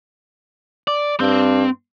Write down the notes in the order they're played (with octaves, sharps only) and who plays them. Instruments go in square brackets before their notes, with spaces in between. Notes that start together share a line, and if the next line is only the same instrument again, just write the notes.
[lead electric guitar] D5
[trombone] G2 [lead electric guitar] C4